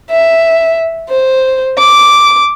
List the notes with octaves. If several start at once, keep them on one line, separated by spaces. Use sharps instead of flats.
E5
C5
D6